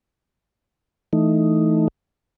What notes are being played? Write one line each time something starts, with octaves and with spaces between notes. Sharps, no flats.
E3 A3 D#4